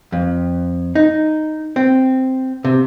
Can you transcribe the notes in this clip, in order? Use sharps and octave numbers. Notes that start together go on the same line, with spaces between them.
F2
D#4
C4
C3